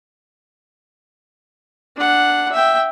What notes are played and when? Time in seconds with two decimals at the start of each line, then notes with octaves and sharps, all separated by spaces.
1.96 D4 F#5
2.52 E5 G5